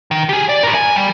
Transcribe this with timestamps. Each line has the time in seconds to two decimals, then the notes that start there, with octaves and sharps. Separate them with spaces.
0.11 D#3
0.29 G4 G#4
0.49 D5
0.63 A2 A#4
0.75 G#5
0.96 G3